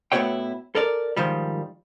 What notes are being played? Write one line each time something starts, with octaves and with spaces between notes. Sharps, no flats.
A2 B3 E4 F#4 C#5 G5
A4 A#4 D5
G#2 D#3 F3 G3